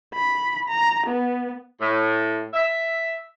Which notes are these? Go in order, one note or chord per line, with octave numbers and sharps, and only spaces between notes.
B5
A#5
B3
A2
E5